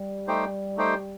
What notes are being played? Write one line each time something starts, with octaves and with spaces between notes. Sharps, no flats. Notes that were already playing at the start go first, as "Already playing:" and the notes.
Already playing: G3
A3 D#4 G4 C5 G5
A3 D#4 G4 C5 G5